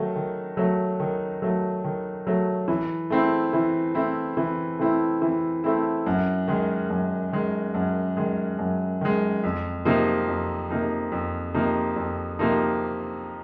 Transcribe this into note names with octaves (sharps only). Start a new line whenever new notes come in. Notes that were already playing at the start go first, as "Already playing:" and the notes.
Already playing: D#3 F#3 A3
D#3
F#3 A3
D#3
F#3 A3
D#3
F#3 A3
E3
A3 C4 E4
E3
A3 C4 E4
E3
A3 C4 E4
E3
A3 C4 E4
F#2
D#3 G#3
F#2
D#3 G#3
F#2
D#3 G#3
F#2
D#3 G#3
F2
C3 F3 A#3 D#4
F2
C3 F3 A#3 D#4
F2
C3 F3 A#3 D#4
F2
C3 F3 A#3 D#4